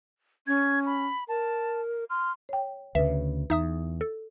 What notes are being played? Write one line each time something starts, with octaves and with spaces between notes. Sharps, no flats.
C#4 G#6
B5
A#4 A5
C6 F6
C#5 G5
D2 C#3 B4 E5
E2 D#4 E5 D#6
A4